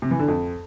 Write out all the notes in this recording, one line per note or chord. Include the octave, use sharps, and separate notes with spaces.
C3
E3
D3
F2